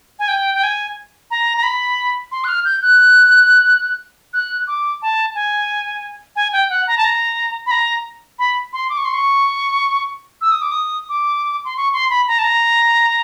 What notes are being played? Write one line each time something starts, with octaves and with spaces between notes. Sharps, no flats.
G#5
G5
G5
G#5
A#5
A#5
B5
C6
F#6
F6
G6
F#6
F#6
D6
A5
G#5
G#5
G5
F#5
A#5
A5
A#5
B5
A#5
B5
C6
D6
C#6
C6
C#6
E6
D#6
D6
D#6
D6
C6
C#6
C6
B5
A#5
A5
A#5